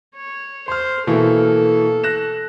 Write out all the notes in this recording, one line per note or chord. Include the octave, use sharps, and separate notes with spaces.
C#5
C5 C6 F6
B2 E3 A#3 A4
F#6 A#6 E7